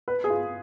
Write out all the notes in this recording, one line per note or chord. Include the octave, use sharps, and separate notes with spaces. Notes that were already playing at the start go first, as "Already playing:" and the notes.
B4
G#4
F4